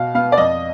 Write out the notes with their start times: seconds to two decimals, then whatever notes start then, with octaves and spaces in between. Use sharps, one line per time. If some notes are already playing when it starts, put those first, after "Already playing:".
Already playing: B2 F5
0.14 B3 F5
0.32 D5
0.37 F2 D#5